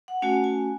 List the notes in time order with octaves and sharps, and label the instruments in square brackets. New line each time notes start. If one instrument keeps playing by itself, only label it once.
[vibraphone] F#5
A3 C#4 F#4 G#5
G#5